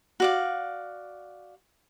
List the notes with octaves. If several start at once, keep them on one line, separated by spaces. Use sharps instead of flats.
F#4 D5 F5